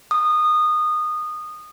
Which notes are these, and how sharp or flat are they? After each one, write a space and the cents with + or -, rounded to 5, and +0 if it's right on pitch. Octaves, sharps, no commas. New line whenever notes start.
D#6 -20